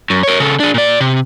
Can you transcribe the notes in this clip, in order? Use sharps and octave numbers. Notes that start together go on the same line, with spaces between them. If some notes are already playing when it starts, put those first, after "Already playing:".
F#2
A#4 C#5
C#3 A4
D4 G#4
A#2 D5
C3